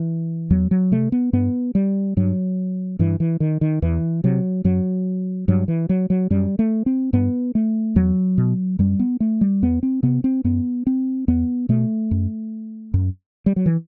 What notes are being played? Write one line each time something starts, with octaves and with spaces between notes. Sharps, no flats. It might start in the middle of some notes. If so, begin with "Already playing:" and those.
Already playing: E3
E2 F#3
F#3
C3 A3
B3
G2 B3
G3
G2 F#3
G2 E3
E3
D#3
D#3
E2 E3
C3 F#3
F#2 F#3
G2 F#3
E3
F#3
F#3
F#2 G3
A3
C4
G2 B3
A3
E2 F#3
B2
F#2 G3
B3
A3
G3
E2 B3
C4
C3 B3
C4
F#2 B3
C4
E2 B3
B2 A3
F#2
F#2
G3
F#3
E3